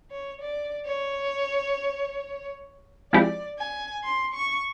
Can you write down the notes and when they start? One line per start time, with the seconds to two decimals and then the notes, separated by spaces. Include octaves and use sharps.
0.11 C#5
0.41 D5
0.86 C#5
3.13 F3 G#3 C4 E4 G4 D5
3.59 G#5
4.04 C6
4.34 C#6